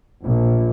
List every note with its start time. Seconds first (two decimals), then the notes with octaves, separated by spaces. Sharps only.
0.23 A#1